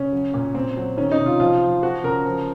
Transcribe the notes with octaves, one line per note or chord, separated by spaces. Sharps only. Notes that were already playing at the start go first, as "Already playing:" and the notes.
Already playing: C#3 C#4
F#3
A#2
A#2 C4
F#3
D#3 C#4
D#4
C3
F4
F3 F4
F3
F3 F#4
C#3 A#4
F3